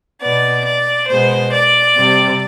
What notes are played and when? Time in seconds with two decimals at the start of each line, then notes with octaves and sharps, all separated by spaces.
0.22 B2 B3 D5
0.65 D5
1.09 B2 G#3 B3 C5
1.53 D5
1.96 C3 G3 C4